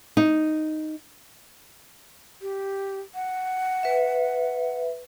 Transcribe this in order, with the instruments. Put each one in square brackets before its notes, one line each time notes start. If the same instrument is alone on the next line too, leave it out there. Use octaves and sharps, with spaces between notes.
[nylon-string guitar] D#4
[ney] G4
F#5
[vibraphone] B4 E5